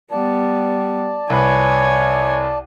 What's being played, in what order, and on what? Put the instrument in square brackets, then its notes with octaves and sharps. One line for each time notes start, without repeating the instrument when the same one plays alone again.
[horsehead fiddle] G3 B3 [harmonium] D5 A5
[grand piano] C2 B4 [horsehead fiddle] C#5 G#5